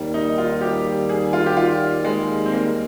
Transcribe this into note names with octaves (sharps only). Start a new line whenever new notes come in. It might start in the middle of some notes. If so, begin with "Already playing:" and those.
Already playing: D#2 D#3 G3
D#4
F4
G4
G#4
F4
G4
F4
G#3
C4
A#3